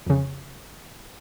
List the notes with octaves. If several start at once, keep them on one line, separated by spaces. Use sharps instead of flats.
F2 C#3